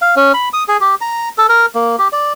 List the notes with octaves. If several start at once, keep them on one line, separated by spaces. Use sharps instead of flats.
F5
C#4
B5
D#6
G#4
G4
A#5
A4
A#4
A#3
G4
D5